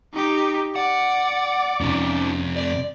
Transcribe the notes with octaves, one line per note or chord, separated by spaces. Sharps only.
D#4 G4
D5 F#5
F2 C3 C#4 D#4
D5